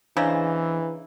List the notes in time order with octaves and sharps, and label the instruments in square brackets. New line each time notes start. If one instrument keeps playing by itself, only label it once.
[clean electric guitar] E2 C5 D#5 [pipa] C#3 [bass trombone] E3 [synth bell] D4 A#5 E6